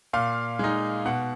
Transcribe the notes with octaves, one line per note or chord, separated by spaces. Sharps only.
A#2 F5
G#3 D#4
B2 F#5